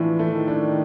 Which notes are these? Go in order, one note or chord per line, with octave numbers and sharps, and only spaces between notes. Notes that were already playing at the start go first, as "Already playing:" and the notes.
Already playing: A2 E3 F3 A3 D4
A3
D#3
D4